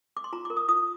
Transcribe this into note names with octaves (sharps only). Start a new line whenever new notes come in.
D6
C6
F4 A#5
D6
A#4
D#6
F4 D#6